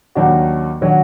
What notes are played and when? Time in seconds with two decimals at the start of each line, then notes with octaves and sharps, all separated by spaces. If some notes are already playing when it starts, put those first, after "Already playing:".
0.15 D#2 D#3 F#3 D4 F#4
0.81 D#3 F#3 D4 F#4